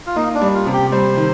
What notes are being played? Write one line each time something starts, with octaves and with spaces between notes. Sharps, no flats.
F4
A#3 D#4
D4
G3
F4
C3
G4
G3 C5
D#3